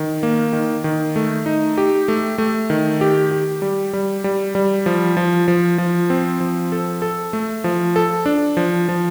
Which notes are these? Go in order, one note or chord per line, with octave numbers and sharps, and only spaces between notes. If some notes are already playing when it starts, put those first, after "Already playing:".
Already playing: D#3
A#3
D#3
D#3
A3
D#4
G4
A3
A3
D#3
G4
G4
G3
G3
G3
G3
F3
F3
F3
F3
C4
F3
A4
A4
A3
F3
A4
D4
F3
F3